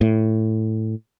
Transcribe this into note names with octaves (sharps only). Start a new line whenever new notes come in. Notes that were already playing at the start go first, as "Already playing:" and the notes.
A2